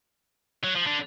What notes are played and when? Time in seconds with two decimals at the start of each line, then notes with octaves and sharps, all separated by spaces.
0.64 F#3
0.76 F3
0.87 D3